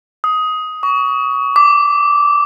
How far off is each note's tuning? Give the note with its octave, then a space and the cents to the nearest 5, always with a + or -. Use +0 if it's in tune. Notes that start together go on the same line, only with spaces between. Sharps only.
D#6 +15
C#6 +30
D6 -10